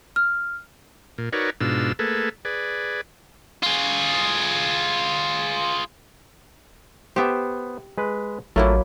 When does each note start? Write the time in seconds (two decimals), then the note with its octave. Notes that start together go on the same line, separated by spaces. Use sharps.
0.16 F6
1.18 A#2
1.33 D#4 F#4 A#4 B4 C#5 D5
1.61 G#2 B2 D4 F4 E6
1.99 A3 A#3 G#4 A4 B4
2.45 G#4 B4 D5
3.63 F4 G#4
7.16 B3 G4 C5 E5
7.98 G#3 B4
8.56 A1 F#3 A3 A#3 E4 F4